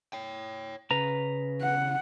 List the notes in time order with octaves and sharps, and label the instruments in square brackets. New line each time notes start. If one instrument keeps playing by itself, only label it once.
[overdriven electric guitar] C#5 G5
[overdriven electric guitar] C#3 [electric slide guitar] B4 A#5
[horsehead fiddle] F#5